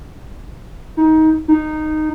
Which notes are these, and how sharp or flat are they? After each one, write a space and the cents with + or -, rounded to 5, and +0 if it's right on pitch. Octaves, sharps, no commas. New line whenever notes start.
D#4 +20
D#4 -10